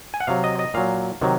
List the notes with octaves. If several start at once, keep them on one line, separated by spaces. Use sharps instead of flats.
G#5
F#5
C3 F#3 F5
D#5
D#5
A#2 F#3 F5
C3 D#3 F#3